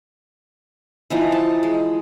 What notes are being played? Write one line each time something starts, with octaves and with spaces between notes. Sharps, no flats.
E3 F3 D#4
A5
G#3